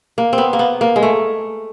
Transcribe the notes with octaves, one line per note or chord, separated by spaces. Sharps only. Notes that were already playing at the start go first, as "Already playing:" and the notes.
A#3
C4
B3
A#3
B3
A#3
G#3
A3